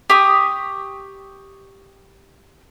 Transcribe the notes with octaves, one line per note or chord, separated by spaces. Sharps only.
G4 C#6 D#6